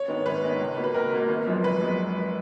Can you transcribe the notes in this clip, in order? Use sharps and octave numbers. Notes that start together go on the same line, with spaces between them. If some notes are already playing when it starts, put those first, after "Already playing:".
Already playing: C#5
G#2 D#3 G#3 B3
G#1 B4
G#2 D#3 G#3 B3
C#2
B2 A#3
B4
C#2 A#4
B2 A#3
G#1
F#2 F3 G#3 B3
G#1 B4
F#2 F3 G#3 B3